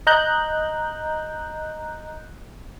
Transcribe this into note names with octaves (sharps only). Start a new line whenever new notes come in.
D#5 A#5 F#6 G6